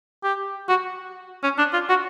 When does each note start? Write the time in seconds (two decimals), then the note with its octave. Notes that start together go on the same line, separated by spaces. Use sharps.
0.23 G4
0.69 F#4
1.43 C#4
1.58 D4
1.73 F4
1.89 F#4